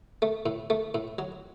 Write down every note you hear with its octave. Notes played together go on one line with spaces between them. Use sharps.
A3
A2
A3
A2
F#3